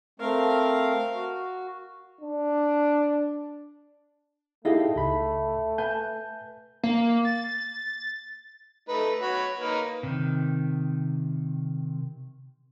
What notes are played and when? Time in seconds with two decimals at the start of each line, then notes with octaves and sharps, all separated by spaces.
0.20 A3 C4 A#4 F5
1.14 F#4
2.21 D4
4.65 A3 D#4 E4 G4 G#4 D#5 F5
4.96 C#2 B5
5.78 B4 G#5 A5 G6
6.83 A#3
7.25 A6
8.89 A3 D#4 B4
9.22 F#4 C#5 B5
9.60 A#3 D#4 B4
10.03 C3 D#3